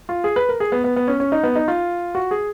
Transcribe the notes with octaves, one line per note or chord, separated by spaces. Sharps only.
F4
G#4
B4
A#4
G#4
B3
B3
B3
C#4
C#4
D#4
B3
D#4
F4
F#4
G#4